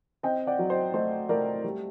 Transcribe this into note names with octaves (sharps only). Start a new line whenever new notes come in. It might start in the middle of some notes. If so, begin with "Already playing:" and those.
C4 D#5 G5
D5 F#5
F#3
C5 D#5
A3 C5 D#5
A3 A#4 D5
G3